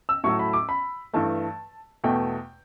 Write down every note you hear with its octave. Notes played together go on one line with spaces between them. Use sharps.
E6
A2 F#3 A3 C#6
B5
D6
B5
G2 E3 A3 A5
E2 B2 A3 G5